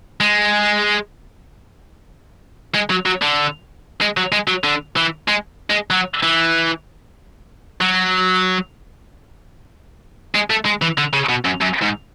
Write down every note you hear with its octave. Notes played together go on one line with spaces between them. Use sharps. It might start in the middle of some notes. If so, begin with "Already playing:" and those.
G#3
G#3
F#3
F#3
D3
G#3
F#3
G#3
F#3
D3
E3
G#3
G#3
F#3
E3
F#3
G#3
A3
G#3
E3
D3
C#3
B2
F#2
F#2
G#2